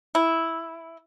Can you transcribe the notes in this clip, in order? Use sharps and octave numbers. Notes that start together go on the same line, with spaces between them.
E4